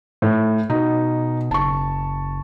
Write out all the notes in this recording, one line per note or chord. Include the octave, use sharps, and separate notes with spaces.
A2
B2 D#4
F#1 A5 C#6